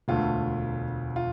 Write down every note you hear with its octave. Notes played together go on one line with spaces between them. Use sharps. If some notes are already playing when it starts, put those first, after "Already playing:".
E1 D2 D3 A3 F4
F4